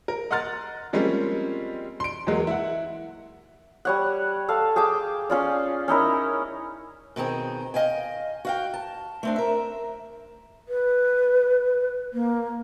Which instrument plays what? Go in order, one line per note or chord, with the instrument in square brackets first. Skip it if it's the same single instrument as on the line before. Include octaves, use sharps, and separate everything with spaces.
[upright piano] A#4
D#5 F#5 A#5 C6 F6 A6
F3 G3 G#3 A#3 C4 C#4
C6 D7
E2 F#3 G#3 A#3
E4 F#5
[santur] G3 C#5 F#5
A4 F5
G#4 G5 A5 D6
C#4 F4 D5
C#4 D#4 E4 A#4
[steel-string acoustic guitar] B2 D#3 C4 G#4
D#5 F5 G5 G#5
F#4 F5 G5
A5
A3 C4 D4
A#4 E5
[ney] B4
A#3